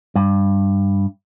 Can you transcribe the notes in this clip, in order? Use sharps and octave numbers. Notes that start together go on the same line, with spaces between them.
G2